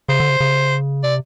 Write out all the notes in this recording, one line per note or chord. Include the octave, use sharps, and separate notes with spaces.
C#3 C5
D3
C#3
C#3
C3 D5